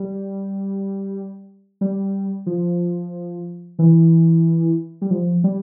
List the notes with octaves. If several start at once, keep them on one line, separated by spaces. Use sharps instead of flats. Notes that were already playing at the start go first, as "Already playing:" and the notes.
Already playing: G3
G3
F3
E3
G3
F3
G3